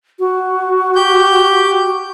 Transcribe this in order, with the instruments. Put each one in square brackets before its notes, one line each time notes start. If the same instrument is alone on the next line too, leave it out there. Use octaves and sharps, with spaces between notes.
[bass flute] F#4
[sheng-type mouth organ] G4 G6